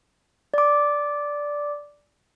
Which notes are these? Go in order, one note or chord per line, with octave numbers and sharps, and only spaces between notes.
D5 D6